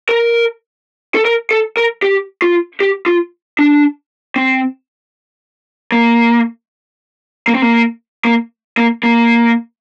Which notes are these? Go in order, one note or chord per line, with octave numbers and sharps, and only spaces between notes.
A#4
A4
A#4
A4
A#4
G4
F4
G4
F4
D4
C4
A#3
A#3
C4
A#3
A#3
A#3
A#3